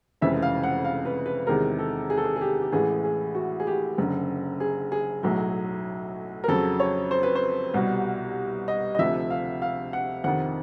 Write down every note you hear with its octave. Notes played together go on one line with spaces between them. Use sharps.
F1 F2 C#3 E3 G#3 E5
F5
F#5
F5
B4
B4
E2 C3 D#3 G#3 A#4
A4
G#4
A4
G#4
G#4
G4
G4
A1 A2 E3 G#3 G#4
G#4
F#4
G#4
G4
F#1 F#2 D3
G#4
G#4
B1 A2 F#3
A#4
F2 C#3 F#3 A4
C#5
C5
B4
C5
C2 B2 G3
D#5
D#5
D2 C3 F3 E5
F5
F5
F#5
F2 C3 D#3 F#5